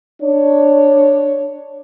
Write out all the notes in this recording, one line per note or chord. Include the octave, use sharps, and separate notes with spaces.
D4 C#5